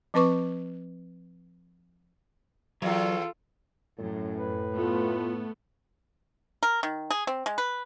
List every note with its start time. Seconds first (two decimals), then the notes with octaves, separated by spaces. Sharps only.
0.14 F3 C4 B4 C#6 D6
2.82 E2 F#3 F4 A4
3.98 F#2 A2
4.36 B4
4.76 A3 B3 F4
6.63 A#4
6.83 D#3
7.10 G#4
7.27 C4
7.46 G#3
7.58 B4